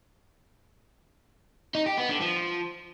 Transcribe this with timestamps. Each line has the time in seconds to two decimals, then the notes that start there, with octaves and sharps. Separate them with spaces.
1.75 D#4
1.86 G4
1.98 B3
2.10 D3
2.22 F3